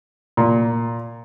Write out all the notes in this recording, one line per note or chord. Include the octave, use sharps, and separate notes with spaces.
A#2